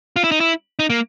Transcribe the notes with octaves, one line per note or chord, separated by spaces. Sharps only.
F4
E4
D#4
E4
D#4
A#3